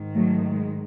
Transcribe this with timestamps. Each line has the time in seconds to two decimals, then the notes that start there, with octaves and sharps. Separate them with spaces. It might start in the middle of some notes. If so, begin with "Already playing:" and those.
Already playing: G#2 D#3
0.15 F#3 A3
0.49 G#3